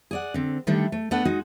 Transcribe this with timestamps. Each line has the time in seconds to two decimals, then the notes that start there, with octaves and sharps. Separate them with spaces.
0.11 G#4 D5 F#5
0.34 D3 C4
0.67 D3 D#3 G3 A3 D4 A4
0.92 A3
1.11 A3 B3 D4 A4 F#5
1.25 G#3 D#4 F#4